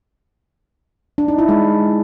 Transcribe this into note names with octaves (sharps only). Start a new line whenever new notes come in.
D4
D#4
E4
G#3